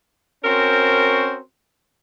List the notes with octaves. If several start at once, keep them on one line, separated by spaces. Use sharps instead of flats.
C4 C#4 F#4 A#4 C5